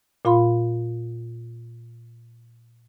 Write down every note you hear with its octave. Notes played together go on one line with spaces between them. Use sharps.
A#2 F4 F5 B5 C6